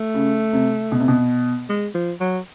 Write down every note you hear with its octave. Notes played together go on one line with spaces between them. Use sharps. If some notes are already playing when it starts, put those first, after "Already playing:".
Already playing: A3
C#3
C3
B2
C3
B2
G#3
F3
F#3